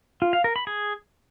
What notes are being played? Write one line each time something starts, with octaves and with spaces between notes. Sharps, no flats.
F4
F5
A#4
B5
G#4